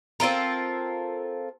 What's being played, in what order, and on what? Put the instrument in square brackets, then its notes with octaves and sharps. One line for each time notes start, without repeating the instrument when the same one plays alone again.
[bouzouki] C4 F4 A4 A#4